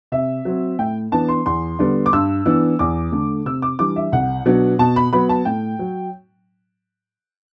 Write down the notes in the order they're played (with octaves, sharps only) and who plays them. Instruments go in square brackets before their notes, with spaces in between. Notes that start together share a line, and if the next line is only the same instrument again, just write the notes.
[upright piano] C3 E5
F#3 C4
A2 G5
E3 B3 D4 A5
C6
E2 C6
D3 G3 B3 D4
D6
G2 E6
E3 B3 D4
E2 D6
D3 A3
C3 E6
D6
E3 G3 D4 D6
E5
C2 F#5
B2 F#3 B3 D4
B2 A5
B5
F#3 B3 B5
A5
A2 G5
F#3